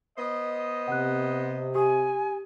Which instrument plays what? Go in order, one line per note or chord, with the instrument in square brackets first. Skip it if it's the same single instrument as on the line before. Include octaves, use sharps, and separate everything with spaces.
[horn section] B3 C5 D#5
[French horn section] C3 [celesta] F#5 F#6
[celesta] G4 D#6 [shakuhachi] G#5